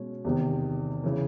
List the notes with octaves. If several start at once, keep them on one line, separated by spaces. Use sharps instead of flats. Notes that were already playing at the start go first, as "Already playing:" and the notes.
Already playing: B2 G#3 C#4
E2 C3 D#3
C#3 E3